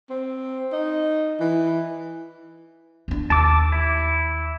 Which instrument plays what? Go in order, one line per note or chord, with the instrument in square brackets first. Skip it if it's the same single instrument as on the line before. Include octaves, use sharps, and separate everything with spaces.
[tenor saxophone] C4
D#4
E3
[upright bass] E2 D4
[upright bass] D#2 [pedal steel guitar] A5 D6 E6
[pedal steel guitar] E4